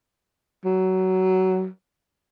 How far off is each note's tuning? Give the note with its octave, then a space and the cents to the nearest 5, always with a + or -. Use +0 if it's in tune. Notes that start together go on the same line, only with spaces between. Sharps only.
F#3 +20